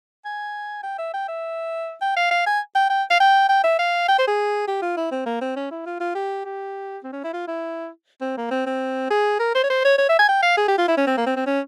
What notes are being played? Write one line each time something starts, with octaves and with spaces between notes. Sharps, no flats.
G#5
G5
E5
G5
E5
G5
F5
F5
G#5
G5
G5
F5
G5
G5
E5
F5
G5
C5
G#4
G4
F4
E4
C4
A#3
C4
C#4
E4
F4
F4
G4
G4
C4
C#4
E4
F4
E4
C4
A#3
C4
C4
G#4
A#4
C5
C#5
C5
C#5
C#5
E5
G#5
G5
F5
G#4
G4
F4
E4
C#4
C4
A#3
C4
C4
C#4